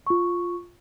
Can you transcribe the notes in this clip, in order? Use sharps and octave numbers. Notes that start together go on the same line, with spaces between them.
F4 C#6